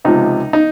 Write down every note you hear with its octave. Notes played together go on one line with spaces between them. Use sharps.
C#2 C3 F3 G#3 D#4
D#4